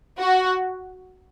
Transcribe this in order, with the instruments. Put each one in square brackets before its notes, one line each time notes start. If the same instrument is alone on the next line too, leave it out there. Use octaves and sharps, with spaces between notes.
[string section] F#4